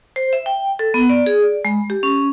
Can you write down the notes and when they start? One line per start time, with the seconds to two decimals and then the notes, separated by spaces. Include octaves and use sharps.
0.16 C5
0.33 E5
0.46 G5
0.79 A4
0.94 B3
1.09 D5
1.26 G#4
1.42 D5
1.65 G#3
1.90 G4
2.03 C#4